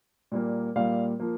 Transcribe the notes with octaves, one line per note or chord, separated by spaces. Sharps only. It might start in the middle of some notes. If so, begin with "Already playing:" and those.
A#2 G3 A#3
A#2 G3 A#3 F5
F3 A#3